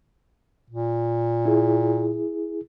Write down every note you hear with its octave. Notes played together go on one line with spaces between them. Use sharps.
A#2
E4 G#4